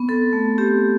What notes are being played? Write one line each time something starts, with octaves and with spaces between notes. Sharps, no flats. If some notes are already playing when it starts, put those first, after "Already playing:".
Already playing: B3
C4 A4
A3
C4 G4